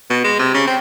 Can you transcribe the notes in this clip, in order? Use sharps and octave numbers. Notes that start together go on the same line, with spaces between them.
B2
G#3
C3
C#3
C4